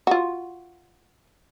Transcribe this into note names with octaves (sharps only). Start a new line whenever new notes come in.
F4 F#4